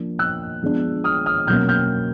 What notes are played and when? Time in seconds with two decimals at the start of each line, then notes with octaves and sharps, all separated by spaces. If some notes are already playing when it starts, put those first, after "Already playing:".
Already playing: F3 A#3 D4
0.19 E6 F#6
0.63 F3 G#3 B3 D4
1.04 D#6 F6
1.26 D#6 F6
1.47 B2 F#3 A#3 C#4 F6 G6
1.69 F6 G6